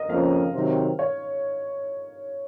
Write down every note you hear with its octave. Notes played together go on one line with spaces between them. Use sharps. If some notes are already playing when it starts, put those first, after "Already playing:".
Already playing: A#4 D#5
F2 C#3 F3 A#3 C#4 F5
C3 D#3 F#3 C4
C#5